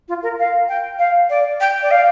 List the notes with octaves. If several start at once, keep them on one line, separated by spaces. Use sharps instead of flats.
F4
A#4
F5
G5
F5
D5
G5
D5
F5